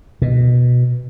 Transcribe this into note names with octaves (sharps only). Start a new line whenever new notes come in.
B2